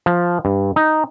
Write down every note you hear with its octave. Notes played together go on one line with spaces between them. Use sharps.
F3
G2
D#4